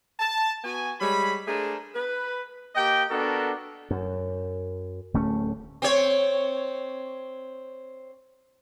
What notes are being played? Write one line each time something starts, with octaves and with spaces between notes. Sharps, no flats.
A5
B3 F#4 G#5
G3 G#3 C#5 B5
A3 D4 G#4 A#4 C5
B4
A#3 G4 D#5 G5
B3 D4 F#4 A4 A#4
F#2
D1 A3 C#4
C4 C#5